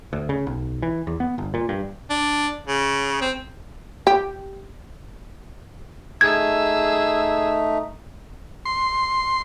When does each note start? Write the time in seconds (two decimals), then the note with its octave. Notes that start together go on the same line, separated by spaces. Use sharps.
0.13 D2
0.29 C#3
0.47 B1
0.82 E3
1.07 E2
1.20 B3
1.38 G1
1.54 A#2
1.69 G2
2.10 D4
2.67 C#3
3.21 C4
4.07 G4
6.21 A3 D#4 G#4 E6 G#6
8.66 C6